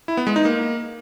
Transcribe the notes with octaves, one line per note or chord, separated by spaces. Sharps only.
E4
B3
G#3
D#4
A#3